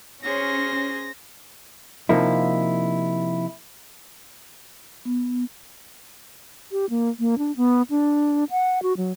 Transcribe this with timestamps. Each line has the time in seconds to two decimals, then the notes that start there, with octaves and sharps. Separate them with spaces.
0.23 C#4 G#4 C5 A#6
2.09 C3 F3 A#3 D#4 E4
5.05 B3
6.72 G4
6.90 A#3
7.20 A#3
7.38 D4
7.57 B3
7.90 D4
8.51 F#5
8.83 F#4
8.97 F#3